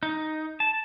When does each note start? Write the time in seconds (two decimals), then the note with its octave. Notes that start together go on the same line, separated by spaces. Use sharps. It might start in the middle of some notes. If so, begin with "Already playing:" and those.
0.03 D#4
0.60 A5